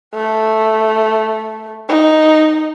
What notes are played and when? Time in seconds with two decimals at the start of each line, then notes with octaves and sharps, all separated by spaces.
0.14 A3
1.89 D#4